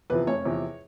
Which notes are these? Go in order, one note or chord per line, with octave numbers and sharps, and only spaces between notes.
E2 C3 F3 B4
F1 C#5
E2 C3 F3